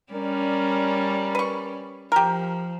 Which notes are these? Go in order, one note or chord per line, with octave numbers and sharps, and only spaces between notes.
G3 C#4 A#4 D5
B4 C#6
F3 G4 A#4